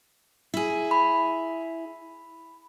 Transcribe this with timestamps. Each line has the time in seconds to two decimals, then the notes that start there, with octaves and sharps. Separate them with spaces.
0.54 E4 G#4
0.91 B5